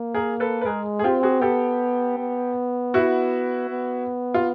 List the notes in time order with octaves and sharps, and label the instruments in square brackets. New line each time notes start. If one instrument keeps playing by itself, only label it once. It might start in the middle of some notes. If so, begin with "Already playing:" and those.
Already playing: [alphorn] A#3
[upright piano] G#4 A#4
A4 B4
B4
[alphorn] G#3 [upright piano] G#4 A#4
[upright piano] G#4
[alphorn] C4 [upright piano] F4 G4
[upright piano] F#4 G#4
[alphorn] B3 [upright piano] G4 A4
[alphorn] B3
[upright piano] E4 F#4
[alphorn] B3
[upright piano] F4